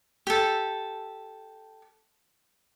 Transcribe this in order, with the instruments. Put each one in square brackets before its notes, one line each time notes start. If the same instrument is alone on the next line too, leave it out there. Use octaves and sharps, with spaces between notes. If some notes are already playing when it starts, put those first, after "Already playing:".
[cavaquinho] G4 A4